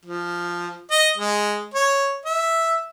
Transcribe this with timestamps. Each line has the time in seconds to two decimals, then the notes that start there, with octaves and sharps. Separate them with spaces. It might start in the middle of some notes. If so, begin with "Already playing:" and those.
0.05 F3
0.91 D#5
1.17 G#3
1.74 C#5
2.25 E5